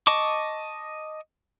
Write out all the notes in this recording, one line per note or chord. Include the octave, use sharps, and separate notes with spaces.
D#5 A5 C#6 D6